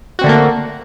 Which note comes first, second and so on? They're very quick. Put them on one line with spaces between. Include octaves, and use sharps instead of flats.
F#4 C4 D3 A3 A#3